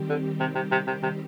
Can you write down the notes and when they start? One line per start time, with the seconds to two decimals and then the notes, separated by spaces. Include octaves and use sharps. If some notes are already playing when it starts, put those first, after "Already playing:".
Already playing: D#3 G3 C4 G4
0.10 D3
0.40 C3
0.55 C3
0.72 C3
0.87 C3
1.03 C3